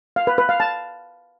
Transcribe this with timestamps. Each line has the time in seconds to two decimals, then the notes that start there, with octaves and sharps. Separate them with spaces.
0.16 F5
0.27 B4
0.38 B4
0.49 F5
0.60 A5